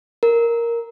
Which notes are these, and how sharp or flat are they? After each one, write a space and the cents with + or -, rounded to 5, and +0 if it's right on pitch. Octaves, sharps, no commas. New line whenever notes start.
A#4 +0